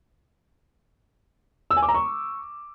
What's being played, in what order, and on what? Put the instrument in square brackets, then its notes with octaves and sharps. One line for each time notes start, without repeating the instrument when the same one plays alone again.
[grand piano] E6
G#5
D6
A#5
C#6